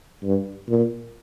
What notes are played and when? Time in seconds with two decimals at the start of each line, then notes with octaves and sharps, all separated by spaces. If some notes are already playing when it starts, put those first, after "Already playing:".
0.23 G2
0.69 A#2